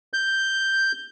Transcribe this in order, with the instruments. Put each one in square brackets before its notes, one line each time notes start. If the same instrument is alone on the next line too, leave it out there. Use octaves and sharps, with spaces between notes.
[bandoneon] G6